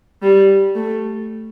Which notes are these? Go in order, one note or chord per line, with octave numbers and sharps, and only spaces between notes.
G3
A3